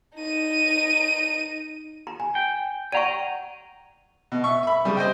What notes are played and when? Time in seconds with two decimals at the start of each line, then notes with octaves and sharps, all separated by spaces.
0.18 D#4 D#7
2.07 A#5
2.20 G#5 A#5
2.35 G5
2.92 D5 F#5 G5 A#5 C#6 D#7
4.32 B2
4.44 E5 C#6
4.63 E5 B5
4.85 C#3 G3
4.97 C5 D#5 G5